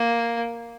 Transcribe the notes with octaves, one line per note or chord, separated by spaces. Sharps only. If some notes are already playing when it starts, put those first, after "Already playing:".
Already playing: A#3